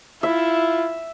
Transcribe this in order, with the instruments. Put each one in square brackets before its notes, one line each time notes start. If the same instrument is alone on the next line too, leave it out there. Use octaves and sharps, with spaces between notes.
[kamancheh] E4 F4 [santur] E5